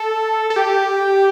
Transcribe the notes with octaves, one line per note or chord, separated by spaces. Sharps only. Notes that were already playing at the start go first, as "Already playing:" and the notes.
Already playing: A4
A4
G4